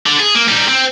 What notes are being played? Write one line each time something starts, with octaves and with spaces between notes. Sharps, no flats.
D3
G#4
A#3
G3 D#4
C4